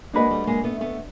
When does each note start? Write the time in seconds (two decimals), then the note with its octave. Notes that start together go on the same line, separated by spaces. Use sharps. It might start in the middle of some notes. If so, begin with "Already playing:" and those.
0.13 G#3 A#3 D4 F#4 B4 D#5
0.31 G3 A3
0.47 G#3 A#3
0.64 A3 B3
0.81 A3 B3